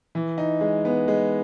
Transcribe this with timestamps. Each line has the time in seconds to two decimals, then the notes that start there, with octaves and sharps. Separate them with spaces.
0.15 E3
0.38 D#4
0.61 G#3
0.85 B3
1.08 G#3